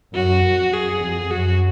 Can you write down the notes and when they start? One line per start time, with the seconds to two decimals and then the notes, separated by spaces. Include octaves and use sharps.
0.15 F#2 F#4
0.44 F#2
0.73 F#2 G#4
1.02 F2
1.31 F#2 F#4